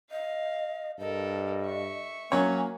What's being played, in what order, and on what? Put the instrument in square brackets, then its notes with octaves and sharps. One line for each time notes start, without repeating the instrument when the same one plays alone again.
[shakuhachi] D#5 [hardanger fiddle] F5
[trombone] G2 [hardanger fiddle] A4 A#4 [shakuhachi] D#5
[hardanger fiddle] E5 C#6
[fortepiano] F#3 C#4 C#5 [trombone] A#3 [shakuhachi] G#5